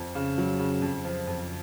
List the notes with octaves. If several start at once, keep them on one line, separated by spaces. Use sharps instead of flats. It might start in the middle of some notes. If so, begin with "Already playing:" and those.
Already playing: F2
C#3
F#3
C#3
F2
F3
F2